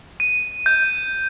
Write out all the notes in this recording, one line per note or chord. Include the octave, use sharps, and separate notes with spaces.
D#7
G6